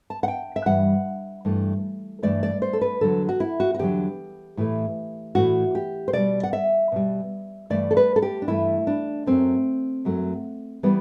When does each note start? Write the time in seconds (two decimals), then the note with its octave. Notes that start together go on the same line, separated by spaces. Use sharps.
0.10 A5
0.23 F#5
0.28 G5
0.56 E5
0.66 G2 E3 G3 F#5
1.45 G2 E3 A3
2.22 G2 E3 A3 D5
2.43 D5
2.62 C5
2.73 A4
2.81 B4
3.01 E2 D3 F#3 A4
3.29 F#4
3.40 E4
3.60 F#4
3.74 F#4
3.79 E2 D3 F#3 G4
4.57 A2 E3 A3
5.35 A2 E3 A3 F#4
5.75 G4
6.08 C5
6.13 B2 G3 D5
6.43 F#5
6.53 E5
6.92 B2 G3
7.70 G2 E3 A3 D5
7.91 A4
7.97 B4
8.16 A4
8.22 G4
8.42 D4
8.48 G2 E3 A3 E4
8.87 D4
9.26 F#2 F#3 A3 C4
10.05 F#2 F#3 A3
10.83 E3 G3 B3